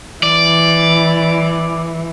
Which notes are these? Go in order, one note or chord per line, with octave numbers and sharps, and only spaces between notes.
E3 D5